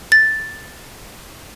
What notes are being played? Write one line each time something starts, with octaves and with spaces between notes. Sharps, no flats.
A6